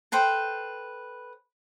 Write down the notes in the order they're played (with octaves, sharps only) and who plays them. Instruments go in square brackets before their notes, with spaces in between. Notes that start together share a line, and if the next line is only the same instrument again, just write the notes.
[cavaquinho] A4 B4 C5 G5